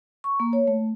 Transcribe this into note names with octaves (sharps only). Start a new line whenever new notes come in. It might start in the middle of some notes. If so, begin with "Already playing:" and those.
C#6
A#3
C#5
A3